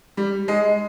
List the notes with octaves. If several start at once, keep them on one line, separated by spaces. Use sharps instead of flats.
G3
G#3